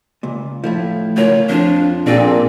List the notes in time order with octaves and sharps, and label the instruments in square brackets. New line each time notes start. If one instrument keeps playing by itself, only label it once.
[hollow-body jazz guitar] C#2 A#2
[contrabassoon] A2 [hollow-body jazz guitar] F3 A3 E4
[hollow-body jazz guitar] C#2 F4 A#4 [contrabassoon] A2 [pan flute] C#5
[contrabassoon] F2 [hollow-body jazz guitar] F3 F4 [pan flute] D4
[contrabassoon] A#1 [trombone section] A#2 [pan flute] C4 [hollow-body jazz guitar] D4 G#4 A4